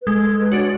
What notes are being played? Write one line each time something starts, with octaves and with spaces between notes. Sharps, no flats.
B4
G#3 A4
B4
D4 F#4 C#5